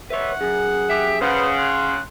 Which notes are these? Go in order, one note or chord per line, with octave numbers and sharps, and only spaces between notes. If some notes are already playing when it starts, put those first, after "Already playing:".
B4 C#5 E5 F#5
F#2 G#4
G4 E5
C#3 C#4 B4 C5 F#5
C6 F#6